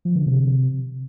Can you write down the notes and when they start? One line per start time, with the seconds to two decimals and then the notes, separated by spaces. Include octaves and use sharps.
0.05 F3
0.16 D3
0.26 C3